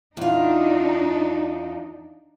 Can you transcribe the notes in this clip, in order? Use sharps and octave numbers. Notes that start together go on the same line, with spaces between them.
E2 D4 D#4 F4